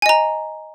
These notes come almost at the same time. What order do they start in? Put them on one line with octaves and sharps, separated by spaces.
G#5 D#5 A#5